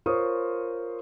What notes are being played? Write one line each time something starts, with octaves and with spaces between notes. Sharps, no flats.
F4 A#4 C5 C#5 C#6 D#6